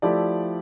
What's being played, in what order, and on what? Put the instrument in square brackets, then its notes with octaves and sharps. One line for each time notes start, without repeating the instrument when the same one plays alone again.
[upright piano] F3 A3 E4 G4 D5